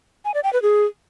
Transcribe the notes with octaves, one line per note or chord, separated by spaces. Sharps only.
G#5
D5
G5
B4
G#4